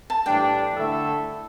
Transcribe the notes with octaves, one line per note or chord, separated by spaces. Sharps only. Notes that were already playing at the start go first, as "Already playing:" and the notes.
A5
A2 E3 G3 D4 G5
D3 A3 E4 A4 E5